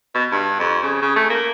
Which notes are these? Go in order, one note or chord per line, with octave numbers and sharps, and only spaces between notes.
B2
G2
F2
C#3
C#3
A3
A#3